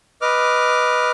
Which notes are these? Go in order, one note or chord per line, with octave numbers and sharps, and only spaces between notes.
B4 D#5 D6 F6